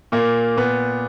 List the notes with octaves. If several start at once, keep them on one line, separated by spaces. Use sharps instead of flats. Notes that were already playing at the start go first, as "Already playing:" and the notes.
A#2 A#3
A#2 B3